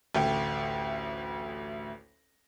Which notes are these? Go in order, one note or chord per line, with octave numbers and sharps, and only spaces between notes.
A1 D2 G5